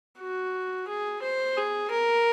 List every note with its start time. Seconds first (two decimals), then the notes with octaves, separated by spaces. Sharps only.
0.20 F#4
0.88 G#4
1.22 C5
1.57 G#4
1.91 A#4